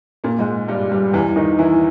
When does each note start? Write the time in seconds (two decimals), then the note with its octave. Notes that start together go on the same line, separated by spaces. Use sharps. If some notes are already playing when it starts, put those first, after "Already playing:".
0.24 A#2 A#3
0.39 G#2 G#3
0.68 G2 G3
0.91 G2 G3
1.13 E2 E3
1.36 D#3 D#4
1.59 E3 E4